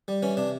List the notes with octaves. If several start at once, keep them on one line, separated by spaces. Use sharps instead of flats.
G3
E3 C#4
C3 D4